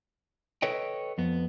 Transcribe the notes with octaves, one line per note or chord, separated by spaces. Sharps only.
A4 B4 C#5 D#5 G5
F2 B3